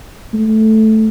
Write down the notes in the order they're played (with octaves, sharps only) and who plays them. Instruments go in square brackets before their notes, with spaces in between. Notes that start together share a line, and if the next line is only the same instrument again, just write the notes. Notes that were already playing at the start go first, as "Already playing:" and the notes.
[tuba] A3